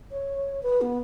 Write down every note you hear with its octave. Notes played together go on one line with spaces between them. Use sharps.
C#5
B4
B3